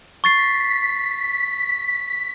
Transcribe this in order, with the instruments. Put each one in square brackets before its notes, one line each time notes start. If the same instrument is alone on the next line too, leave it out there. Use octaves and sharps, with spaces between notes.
[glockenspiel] C#6 A6 C7 [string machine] B6